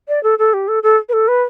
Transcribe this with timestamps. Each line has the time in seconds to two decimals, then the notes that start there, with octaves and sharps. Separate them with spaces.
0.08 D5
0.23 A4
0.39 A4
0.53 G4
0.68 A4
0.83 A4
1.09 B4
1.13 A4
1.28 B4